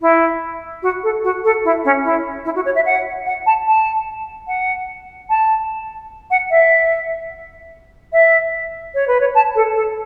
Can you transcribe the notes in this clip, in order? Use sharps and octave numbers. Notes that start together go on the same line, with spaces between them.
E4
F#4
A4
F#4
A4
E4
C#4
E4
E4
F#4
C#5
E5
F#5
F#5
A5
A5
F#5
A5
F#5
E5
E5
C#5
B4
C#5
A5
A4
A4